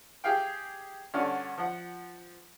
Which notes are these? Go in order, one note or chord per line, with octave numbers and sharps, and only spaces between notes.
G4 G#4 F5 G5
G2 D3 C#4 F#4 D5 F6
F3 F#5